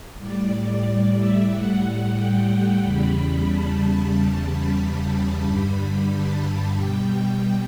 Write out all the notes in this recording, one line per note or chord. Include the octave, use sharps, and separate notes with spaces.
A2 G3 D5
E5
A2 G3 F#5
G5
E2 C#3 G3 B5
A5
E2 C#3 G3
B5
A5
A5
G2 D3 G3 B5
A5
A5
B2 G3 G5
G5